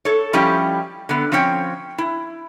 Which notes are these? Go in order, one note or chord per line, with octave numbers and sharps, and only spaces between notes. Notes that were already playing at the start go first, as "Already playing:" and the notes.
A4 C#5
F3 G3 C#4 E4 G4 D#5
D3 B3
F3 C4 C#4 C#5 G5
E4